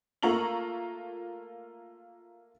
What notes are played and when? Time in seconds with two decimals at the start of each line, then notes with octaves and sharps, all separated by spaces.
0.22 A3 A#3 F4 A#5 C#6 F#7